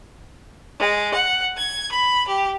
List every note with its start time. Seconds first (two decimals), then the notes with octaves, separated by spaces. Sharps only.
0.78 G#3
1.13 F#5
1.57 G#6
1.90 B5
2.27 G4